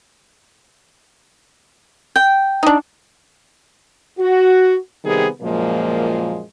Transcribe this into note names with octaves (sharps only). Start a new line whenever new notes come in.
G5
D4 D#4
F#4
C3 D#3 G3 B3 G#4
F#2 A#2 F3 G#3 A#3